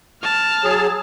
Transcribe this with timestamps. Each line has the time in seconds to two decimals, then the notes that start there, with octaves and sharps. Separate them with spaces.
0.23 A5 F6
0.63 F#3 G#4